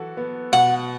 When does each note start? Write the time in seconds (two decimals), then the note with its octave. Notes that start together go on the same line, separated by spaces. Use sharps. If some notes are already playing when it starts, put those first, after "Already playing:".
Already playing: E3 F#4 A4
0.17 B3
0.52 B2 F#5